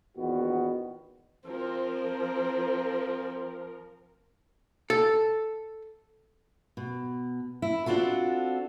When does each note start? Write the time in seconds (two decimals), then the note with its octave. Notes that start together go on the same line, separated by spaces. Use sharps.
0.17 A#1 E2 D#3 B3 F#4
1.48 F3 C4 A#4
4.90 A4
6.77 B2
7.62 E4
7.86 C4 D4 F4 F#4 A4